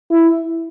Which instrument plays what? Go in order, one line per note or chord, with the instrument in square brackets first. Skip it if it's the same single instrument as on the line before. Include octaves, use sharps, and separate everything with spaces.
[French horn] E4